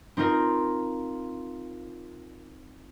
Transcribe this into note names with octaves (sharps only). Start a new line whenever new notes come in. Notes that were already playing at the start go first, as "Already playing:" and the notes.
C4 D#4 F4 A#4